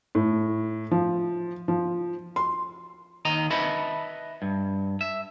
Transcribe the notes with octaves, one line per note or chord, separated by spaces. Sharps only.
A2
F3
F3
C6
D#2 D#3 D#5 A#5
B4 D#5 E5 A5 B5
G2
E5